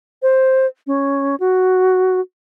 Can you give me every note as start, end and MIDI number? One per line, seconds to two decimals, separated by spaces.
0.22 0.66 72
0.87 1.35 61
1.40 2.20 66